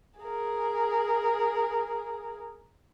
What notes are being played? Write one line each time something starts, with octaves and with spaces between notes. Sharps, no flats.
G#4 A#4